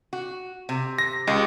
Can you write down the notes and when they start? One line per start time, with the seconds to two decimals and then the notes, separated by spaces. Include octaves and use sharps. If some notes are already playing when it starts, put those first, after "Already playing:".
0.13 F#4
0.69 C3
0.98 A#6
1.27 C#2 G#3 G4